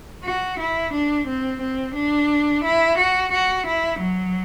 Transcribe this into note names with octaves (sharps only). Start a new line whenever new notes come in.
F#4
E4
D4
C4
C4
D4
E4
F#4
F#4
E4
F#3